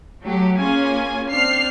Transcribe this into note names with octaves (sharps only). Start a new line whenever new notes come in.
F#3 A3 F#4 G4
A#3 C#4 F4 G#4 G#5
C4 D4 F6 C7